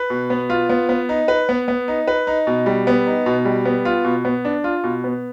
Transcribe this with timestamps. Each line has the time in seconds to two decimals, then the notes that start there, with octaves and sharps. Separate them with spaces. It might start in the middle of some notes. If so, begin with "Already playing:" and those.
Already playing: B4
0.10 B2
0.30 B3
0.50 F4
0.69 B3
0.89 B3
1.09 D#4
1.28 B4
1.49 B3
1.68 B3
1.88 D#4
2.08 B4
2.27 D#4
2.47 B2
2.66 G3
2.87 B3
3.07 D#4
3.26 B2
3.45 G3
3.65 B3
3.85 F4
4.04 B2
4.25 B3
4.45 D4
4.64 F4
4.84 B2
5.04 B3